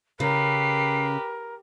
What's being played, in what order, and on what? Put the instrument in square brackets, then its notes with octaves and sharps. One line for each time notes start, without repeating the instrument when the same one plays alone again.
[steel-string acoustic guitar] C#3 [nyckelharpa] G4 B4 [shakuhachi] A#4 [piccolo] C7